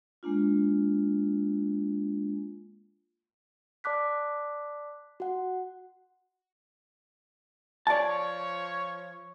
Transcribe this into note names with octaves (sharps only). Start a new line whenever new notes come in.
G#3 A#3 D4 F4
D5 A5 D6 F#6 B6
F#4 F#5
F3 C#5 D5 A5